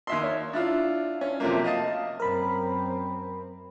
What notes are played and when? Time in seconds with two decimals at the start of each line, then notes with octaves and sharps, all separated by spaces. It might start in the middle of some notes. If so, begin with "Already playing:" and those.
0.07 D#2 E5 C6
0.23 C#5
0.53 D4 E4 F4
1.21 C#4
1.40 C3 F3 F#3 A3 A#3
1.64 D#5 F5 A5
2.20 F#2 C4 A#4 B5